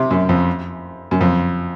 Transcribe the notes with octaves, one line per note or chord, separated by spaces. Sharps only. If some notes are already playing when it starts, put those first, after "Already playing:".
Already playing: C3
F#2
F2
F#2
F2